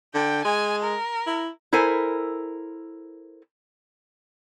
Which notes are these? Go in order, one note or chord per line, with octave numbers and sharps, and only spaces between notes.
D3 G5
G#3 G#5
A#4
E4
E4 A4 A#4 C5 G#5